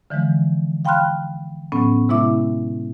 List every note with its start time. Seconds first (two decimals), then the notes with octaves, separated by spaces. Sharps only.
0.10 D3 E3 F3 G#3
0.85 F5 G5 B5 C6 F6 F#6
1.72 A2 F#3 B3 C#4
2.09 C3 G#3 B3 E4 E5 D6